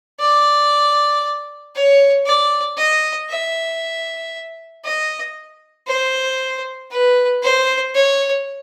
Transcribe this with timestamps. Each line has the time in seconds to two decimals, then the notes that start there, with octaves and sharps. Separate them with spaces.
0.20 D5
1.75 C#5
2.26 D5
2.78 D#5
3.29 E5
4.84 D#5
5.87 C5
6.91 B4
7.42 C5
7.94 C#5